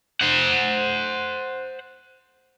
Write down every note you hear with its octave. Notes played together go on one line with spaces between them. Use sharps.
C5 F#5